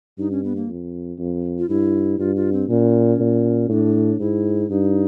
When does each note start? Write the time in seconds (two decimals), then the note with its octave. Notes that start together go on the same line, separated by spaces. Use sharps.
0.18 G2 D#4
0.31 C#4
0.44 B3
0.56 A#3
0.68 F2
1.19 F2
1.59 F4
1.69 G2 E4
2.19 G2 F4
2.36 F4
2.52 C4
2.69 A#2 C#4
3.20 A#2
3.69 A2 D4
4.20 G#2 E4
4.70 G2 D#4